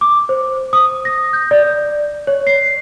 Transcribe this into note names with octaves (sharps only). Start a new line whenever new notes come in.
D6
C5
D#6
A#6
G6
D5
C#5
C7